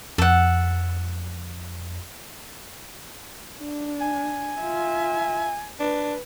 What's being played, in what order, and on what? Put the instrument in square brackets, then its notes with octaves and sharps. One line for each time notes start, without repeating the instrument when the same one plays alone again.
[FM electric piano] F2 [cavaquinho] A4 F#5
[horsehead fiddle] D4
[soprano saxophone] G#5
[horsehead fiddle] F4 E5
[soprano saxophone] D4 [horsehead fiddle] B4